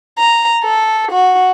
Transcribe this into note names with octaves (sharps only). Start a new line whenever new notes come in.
A#5
A4
F#4